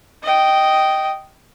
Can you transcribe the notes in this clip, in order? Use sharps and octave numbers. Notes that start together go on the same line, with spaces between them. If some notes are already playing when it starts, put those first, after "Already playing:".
D#5 G5